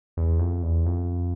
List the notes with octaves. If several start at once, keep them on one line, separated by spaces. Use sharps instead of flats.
E2
F2
E2
F2